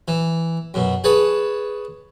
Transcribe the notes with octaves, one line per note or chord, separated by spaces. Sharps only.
E3
F#2 B2
G#4 B4 C#5 A5